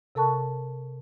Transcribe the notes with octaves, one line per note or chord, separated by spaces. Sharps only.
C3 A4 A#4 A5 C#6 F#6